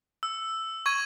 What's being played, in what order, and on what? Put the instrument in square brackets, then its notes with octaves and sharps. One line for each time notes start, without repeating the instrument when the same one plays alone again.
[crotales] E6
C#6 G#6 D#7